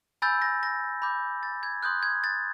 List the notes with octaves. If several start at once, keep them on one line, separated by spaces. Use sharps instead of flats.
G#5 B5 E6 G6 A6
A#6
A#6
B5 D6 G6
A6
G#6
C6 D#6 F#6 G6
G#6
A6